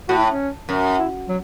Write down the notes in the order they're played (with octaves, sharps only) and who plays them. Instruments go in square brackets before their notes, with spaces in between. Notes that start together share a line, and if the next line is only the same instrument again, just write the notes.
[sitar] A2 [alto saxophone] F#4
[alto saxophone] E4
C#4
[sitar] F#2
[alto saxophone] E4
F#3